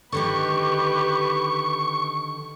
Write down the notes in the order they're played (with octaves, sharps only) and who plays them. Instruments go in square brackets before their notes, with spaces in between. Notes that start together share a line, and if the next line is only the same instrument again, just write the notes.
[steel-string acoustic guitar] D3 D#3 D#4 [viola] G4 B4 [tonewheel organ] C#6